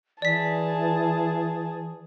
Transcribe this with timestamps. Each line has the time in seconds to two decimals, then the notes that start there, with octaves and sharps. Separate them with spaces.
0.22 E3 G#4 D5 A5 B6